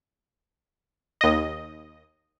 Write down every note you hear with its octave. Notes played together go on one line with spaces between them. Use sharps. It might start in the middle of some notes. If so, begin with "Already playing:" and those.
D#2 D#5